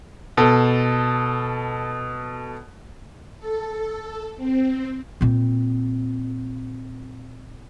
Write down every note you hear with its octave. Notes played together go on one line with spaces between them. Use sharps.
B2 A4
A4
C4
A#2 C4